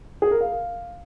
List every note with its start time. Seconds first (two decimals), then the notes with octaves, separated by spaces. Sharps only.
0.22 G#4
0.31 A#4
0.41 F5